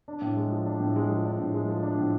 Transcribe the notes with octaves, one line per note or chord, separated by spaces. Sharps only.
D4
A2
G#3
F3
D4
A2
G#3
F3
D4
A2
G#3
F3
D4
A2